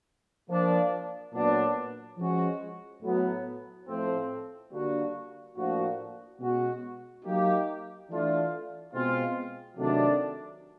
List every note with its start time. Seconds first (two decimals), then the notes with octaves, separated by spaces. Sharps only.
0.48 F3 A#3 D4
1.33 A#2 F#3 B3 D4
2.17 F3 G#3 C#4 F#4
3.02 A2 F#3 B3
3.87 A2 F3 A3 C4
4.70 D3 G3 A#3 D4 F#4
5.55 A2 F3 A#3 D4 F#4
6.39 B2 G#3 C#4 F#4
7.24 F#3 A#3 D#4 G4
8.09 E3 A3 D4 F4
8.92 B2 G#3 C4 F4
9.77 C3 D#3 F#3 A3 D4